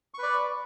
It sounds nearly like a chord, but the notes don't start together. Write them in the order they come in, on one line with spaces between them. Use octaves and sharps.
C#6 B4 D5